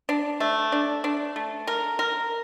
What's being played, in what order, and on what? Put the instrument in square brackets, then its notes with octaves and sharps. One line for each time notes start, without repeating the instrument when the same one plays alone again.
[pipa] D4
A3
D4
D4
A3
A#4
A#4